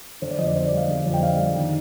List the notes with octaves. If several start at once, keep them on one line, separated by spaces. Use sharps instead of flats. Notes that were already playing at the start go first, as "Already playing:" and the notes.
D3 C5
D5
F2 D#5
D5
D4 C5
D5
G3 F5
D3
F2
G5
D4 F5
G3
D#3